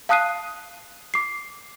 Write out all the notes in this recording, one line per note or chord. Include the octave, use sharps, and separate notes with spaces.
F5 A5 D#6 F#6 C7 D#7
D6 C7